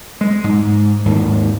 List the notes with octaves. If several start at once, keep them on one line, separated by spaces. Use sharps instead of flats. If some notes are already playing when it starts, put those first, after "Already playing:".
G#3
G#2
D#2 G#2